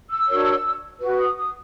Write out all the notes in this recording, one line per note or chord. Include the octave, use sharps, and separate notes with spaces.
E6
D4 F#4 A#4 C#5
F#4 B4
D#6
D#6